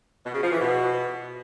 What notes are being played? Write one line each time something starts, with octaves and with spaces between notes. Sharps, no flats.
B2
C#3
F3
E3
B2